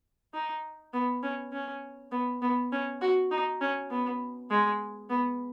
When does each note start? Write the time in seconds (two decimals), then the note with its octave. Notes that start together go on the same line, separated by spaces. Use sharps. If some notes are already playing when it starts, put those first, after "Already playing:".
0.34 D#4
0.93 B3
1.23 C#4
1.53 C#4
2.12 B3
2.42 B3
2.72 C#4
3.02 F#4
3.31 D#4
3.61 C#4
3.91 B3
4.50 G#3
5.10 B3